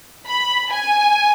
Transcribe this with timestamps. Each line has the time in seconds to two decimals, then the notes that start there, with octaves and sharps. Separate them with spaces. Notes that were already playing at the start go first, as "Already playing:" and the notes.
0.28 B5
0.72 G#5